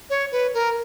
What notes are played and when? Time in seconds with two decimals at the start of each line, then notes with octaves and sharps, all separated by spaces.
0.10 C#5
0.32 B4
0.54 A#4